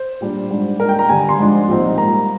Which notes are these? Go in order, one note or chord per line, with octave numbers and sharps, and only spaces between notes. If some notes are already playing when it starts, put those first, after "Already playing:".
Already playing: C5
A#2 G3 D4
G#2 G3 D4
A#2 G#3 D4 A#4
G5
A#5
G2 D3 G3 G#5
A#5
C6
G#2 F3 G#3 D4
C2 A#2 F3 C4 D#4
G#2 G3 A#3 A#5